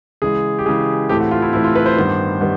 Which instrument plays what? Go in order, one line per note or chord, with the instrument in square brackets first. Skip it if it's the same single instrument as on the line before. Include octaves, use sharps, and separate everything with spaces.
[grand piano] C#3 E3 G#3 G#4
G4
C#3 E3 G#3 G#4
A2 E3 A3 C4 G4
F#4
F4
E4
A2 E3 A3 C4 E4
F4
B4
C5
G2 D#3 G3 B3
D#3 G3 B3